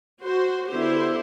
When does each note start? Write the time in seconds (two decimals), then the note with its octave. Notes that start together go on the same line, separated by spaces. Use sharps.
0.21 F#4 C5
0.69 D3 B3 E4 G4 C5